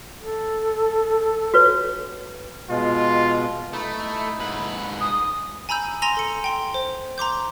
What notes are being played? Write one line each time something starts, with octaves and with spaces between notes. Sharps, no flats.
A4
F#4 B4 C#5
B2 G#3 F4
A3 D#4 E4
G#2 B4
G#4 D#6
G#5 A#5 B5 E6 G6
G#5 A#5 C6 E6 A#6 F7
A4 C#7
G5 C6
C5
A#5 C6 D6 G6